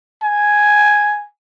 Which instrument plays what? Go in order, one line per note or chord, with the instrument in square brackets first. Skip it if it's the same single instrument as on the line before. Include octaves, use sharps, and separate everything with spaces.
[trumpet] G#5